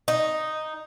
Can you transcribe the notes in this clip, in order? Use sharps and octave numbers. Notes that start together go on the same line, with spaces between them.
D#4